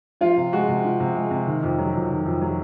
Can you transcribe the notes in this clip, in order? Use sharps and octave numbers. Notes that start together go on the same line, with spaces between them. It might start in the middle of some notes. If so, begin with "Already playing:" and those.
F3 F4
C3
G#3 F#4
C3
F3
C3
G#3
C3
D#3
F2
F#3
F2
D#3
F2
F#3